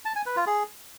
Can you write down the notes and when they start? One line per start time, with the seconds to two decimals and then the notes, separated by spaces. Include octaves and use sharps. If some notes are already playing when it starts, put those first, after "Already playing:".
0.05 A5
0.16 G#5
0.26 B4
0.36 F4
0.47 G#4